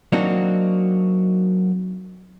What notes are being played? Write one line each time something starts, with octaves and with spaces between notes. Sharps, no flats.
F#3 A#3 C4 D4 D#4 F#4